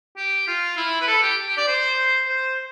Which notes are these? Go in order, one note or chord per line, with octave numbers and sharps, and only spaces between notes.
G4
F4
E4
B4
A4
G4
G4
D5
C5
C5